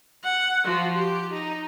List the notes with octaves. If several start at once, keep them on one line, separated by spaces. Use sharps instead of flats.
F#5
F3 F#4
G4
D#4